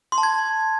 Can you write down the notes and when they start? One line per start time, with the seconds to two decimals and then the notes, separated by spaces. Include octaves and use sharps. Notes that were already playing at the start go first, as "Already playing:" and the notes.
0.12 C6
0.18 A5
0.23 G#6